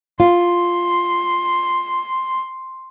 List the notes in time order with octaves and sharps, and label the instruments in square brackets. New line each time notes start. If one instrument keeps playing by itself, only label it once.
[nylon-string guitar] F4 [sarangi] C6